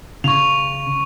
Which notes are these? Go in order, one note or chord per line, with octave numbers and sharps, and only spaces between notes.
C#3 C#6 F7